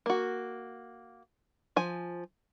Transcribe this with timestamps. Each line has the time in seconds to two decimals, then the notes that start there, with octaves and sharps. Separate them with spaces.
0.06 A#3 F#4
1.76 F3 G#5